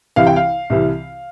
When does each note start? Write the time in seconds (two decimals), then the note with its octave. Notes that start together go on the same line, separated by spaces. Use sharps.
0.16 C2 C3 E3 F5
0.27 G5
0.36 F5
0.70 C2 C3 E3